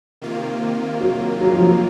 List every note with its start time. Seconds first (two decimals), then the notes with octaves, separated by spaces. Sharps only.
0.22 C3 D#3 A#3 F4
1.01 F#3
1.41 F#3
1.52 F3
1.63 F#3